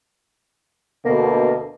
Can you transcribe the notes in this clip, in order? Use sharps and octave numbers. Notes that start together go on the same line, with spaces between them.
D2 B2 A#3